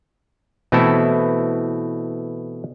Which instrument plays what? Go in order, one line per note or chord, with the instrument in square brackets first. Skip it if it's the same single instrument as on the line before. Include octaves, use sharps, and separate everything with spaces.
[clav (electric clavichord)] B2 E3 A3 C4 E4 A4